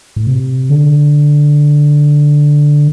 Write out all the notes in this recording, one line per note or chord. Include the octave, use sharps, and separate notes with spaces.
A2
C3
D3